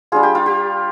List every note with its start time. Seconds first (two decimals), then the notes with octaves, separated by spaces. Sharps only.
0.12 G3 D4 F4 G#4
0.23 G4
0.35 F4
0.46 G4